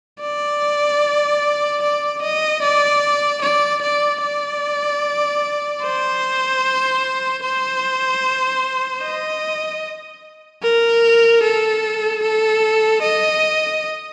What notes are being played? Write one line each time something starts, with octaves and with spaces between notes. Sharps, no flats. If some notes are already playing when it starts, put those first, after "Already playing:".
D5
D5
D#5
D5
D5
D5
D5
C5
C5
D#5
A#4
A4
A4
D#5